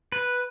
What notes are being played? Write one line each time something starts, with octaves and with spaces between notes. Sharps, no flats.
B4